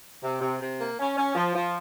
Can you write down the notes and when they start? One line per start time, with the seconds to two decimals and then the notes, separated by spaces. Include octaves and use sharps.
0.22 C3
0.41 C3
0.60 C3
0.78 A#3
0.98 C#4
1.17 C#4
1.35 F3
1.54 F3